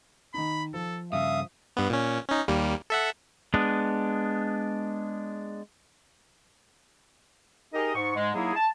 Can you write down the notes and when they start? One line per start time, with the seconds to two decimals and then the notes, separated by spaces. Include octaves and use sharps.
0.34 D#3 D#4 B5
0.74 F3 A4
1.13 G2 C#3 E5 F5 D#6
1.77 G2 B3
1.90 A#2 C#4
2.29 C#4 D#4
2.48 D#2 G3 A#3
2.90 A4 E5 F#5
3.54 G#3 B3 D4
7.73 D#4 G4 G#4 A#4 D#5
7.95 G#2 C#6
8.16 G#2 G#3
8.34 F#3 A#3 D#4 E4 G#4
8.54 A5